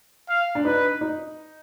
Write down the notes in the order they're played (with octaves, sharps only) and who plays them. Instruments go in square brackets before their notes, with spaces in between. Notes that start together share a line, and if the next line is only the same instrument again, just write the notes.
[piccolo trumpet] F5
[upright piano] D4
[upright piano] D#4 [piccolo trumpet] B4
[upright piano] D#4